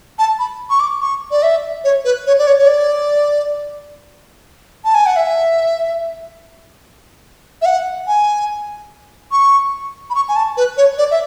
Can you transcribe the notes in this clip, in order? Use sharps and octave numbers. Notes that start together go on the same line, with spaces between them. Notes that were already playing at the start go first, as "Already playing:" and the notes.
A5
B5
C#6
D6
C#6
D5
E5
C#5
B4
C#5
D5
C#5
C#5
D5
A5
G#5
F#5
E5
E5
F#5
G#5
C#6
B5
C#6
G#5
A5
B4
C#5
D5
E5